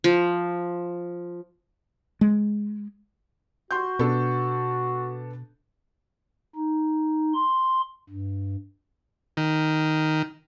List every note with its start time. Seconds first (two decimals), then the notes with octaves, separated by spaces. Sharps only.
0.04 F3
2.21 G#3
3.71 F#4 C6 G6
3.99 B2 B3 D4 A4
6.56 D#4
7.34 C6
8.10 G2
9.37 D#3